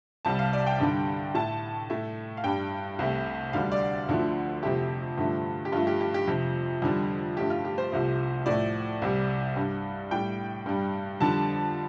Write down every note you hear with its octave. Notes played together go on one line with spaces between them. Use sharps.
C2 C3 G3 A5
F5
D5
G5
G2 D3 G3
A2 A3 A5
A2 A3
F5
G2 G3 G5
C2 C3 A3
D2 D3 G3 F5
D5
D2 D3 F3 A3
F2 C3 A3 G4
G2 D3 F3 A3
G4
G2 F3 A3 F4
G4
G4
G4
F2 C3 F3
F2 D3 G3
G2 F3 A3 G4
F4
G4
C5
C2 C3 F3 A3
A2 F3 A3 D5
C2 C3 G3
G2 G3
A2 G3 G5
G2 G3
F2 D3 G3 A5